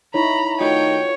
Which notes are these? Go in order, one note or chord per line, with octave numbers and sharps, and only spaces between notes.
D#4 E4 C#5 A#5 B5
D#3 A3 D#4 F4 F#4 C#5 G5